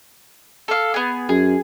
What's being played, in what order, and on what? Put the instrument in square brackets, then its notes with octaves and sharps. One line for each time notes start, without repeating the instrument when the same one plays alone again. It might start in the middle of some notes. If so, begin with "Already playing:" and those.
[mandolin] A4 F5
B3 G#4
[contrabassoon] F#2 [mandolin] G#4